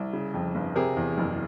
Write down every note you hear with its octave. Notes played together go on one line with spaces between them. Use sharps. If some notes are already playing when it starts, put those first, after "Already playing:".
Already playing: C2
C#3
F2
G1
C3 G#4 A#4
E2
F#1